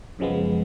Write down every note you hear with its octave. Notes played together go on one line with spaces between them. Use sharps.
F#2 C#3 F3 G#3 B3